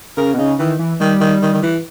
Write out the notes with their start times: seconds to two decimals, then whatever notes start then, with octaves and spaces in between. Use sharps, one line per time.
0.17 C#3 A#4
0.34 B2
0.38 C#3 D#4
0.59 D#3 E3
0.79 E3
1.00 D#3 G3
1.21 D#3
1.42 D#3
1.54 D#3
1.62 E3